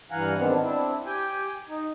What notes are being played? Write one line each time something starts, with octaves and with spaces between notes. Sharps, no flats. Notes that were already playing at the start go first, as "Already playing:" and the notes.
G2 E3 F5 F#5 G#5 A#5
G#2 D#3 B3 C4 D4
C4 D4 E4
G4 G5 G#5
D#4